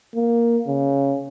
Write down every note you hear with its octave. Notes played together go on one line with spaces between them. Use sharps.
A#3
C#3